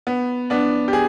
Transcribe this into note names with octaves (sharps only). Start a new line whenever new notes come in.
B3
B3 D4
G4
G#4